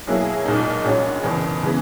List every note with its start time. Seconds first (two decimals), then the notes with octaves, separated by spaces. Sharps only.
0.07 B2 F#3 A#3 E4 G#4
0.45 B1 A#2 G#3 D#4
0.84 A#1 A#2 G#3 C#4 F#4
1.23 F#1 E2 B2
1.62 C#3 E3 G#3 B3